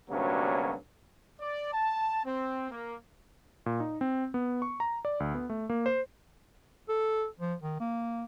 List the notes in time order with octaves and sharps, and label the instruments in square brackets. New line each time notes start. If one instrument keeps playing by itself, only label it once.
[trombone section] D2 G2 C3 F#3 A#3 C#4
[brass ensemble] D5
A5
C4
A#3
[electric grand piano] A#2
D#4
C4
B3
C#6
A#5
D5
D2
B3
A3
A#3
C5
[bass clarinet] A4
F3
D#3
A#3